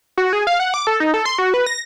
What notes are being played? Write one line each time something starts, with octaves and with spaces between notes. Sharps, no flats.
F#4
G#4
F5
F#5
D6
A4
D#4
A4
C6
F#4
B4
A#6